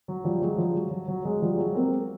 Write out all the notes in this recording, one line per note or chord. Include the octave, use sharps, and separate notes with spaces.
F#3
F3 G3
F#3 G#3
F3 G3
F#3
F#3
F#3
F#3 G#3
F3 G3
F#3 G#3
A#3 C4